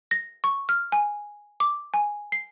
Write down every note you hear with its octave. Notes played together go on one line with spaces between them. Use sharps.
A#6
C#6
F6
G#5
D6
G#5
C7